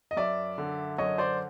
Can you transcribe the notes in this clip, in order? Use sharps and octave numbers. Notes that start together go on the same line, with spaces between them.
D#5
F#2 D5 E5
D3
F#2 C#5 D#5
C5 D5